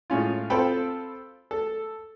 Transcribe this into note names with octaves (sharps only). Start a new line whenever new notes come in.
A2 G#3 C#4 F4
C4 F4 A4 G5 B5
A4